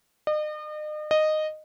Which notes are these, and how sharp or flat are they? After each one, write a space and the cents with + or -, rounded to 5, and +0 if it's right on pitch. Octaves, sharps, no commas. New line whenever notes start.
D#5 -40
D#5 -10